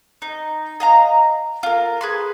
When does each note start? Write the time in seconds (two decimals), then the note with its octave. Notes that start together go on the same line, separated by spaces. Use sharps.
0.22 D#4
0.80 D#5 F5 A#5
1.63 F4 A#4
2.01 G#4 B4 C6